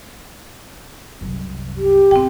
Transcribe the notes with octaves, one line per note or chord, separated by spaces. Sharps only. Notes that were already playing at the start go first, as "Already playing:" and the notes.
C2 F#2
G4
G#2 C4 G5